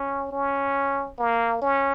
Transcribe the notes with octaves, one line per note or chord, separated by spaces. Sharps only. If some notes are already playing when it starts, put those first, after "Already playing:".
Already playing: C#4
C#4
A#3
C#4